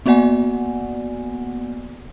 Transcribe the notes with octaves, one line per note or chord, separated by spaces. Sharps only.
A#3 B3 F#4 D5 F#5 G#5